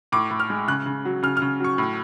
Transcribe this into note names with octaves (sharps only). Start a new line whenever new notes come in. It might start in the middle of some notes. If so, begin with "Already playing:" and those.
A2 D6
A2
F6
G#3
C#3 F#6
C#3
F#3
C#3 F6
C#3 F6
F#3 C#6
A2